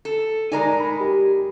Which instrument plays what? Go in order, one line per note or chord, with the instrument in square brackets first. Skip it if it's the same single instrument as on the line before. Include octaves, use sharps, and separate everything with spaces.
[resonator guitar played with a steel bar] A4
[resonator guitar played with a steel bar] G#3 A#4 G#5 [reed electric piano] D#4 D5 A#5
[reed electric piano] B5
G4